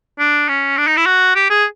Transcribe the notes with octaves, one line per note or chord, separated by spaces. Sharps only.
D4
C#4
D4
D#4
E4
F#4
G4
G#4